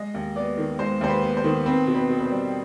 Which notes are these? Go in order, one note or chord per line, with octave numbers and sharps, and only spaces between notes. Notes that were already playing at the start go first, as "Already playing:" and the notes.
Already playing: G#3 D#5
D#2
B3 D5
D#3
G#3 C5
D#2 C5
B4
B3
C5
D#3
C4 B4
B2
B4
B2
B4
C5
G3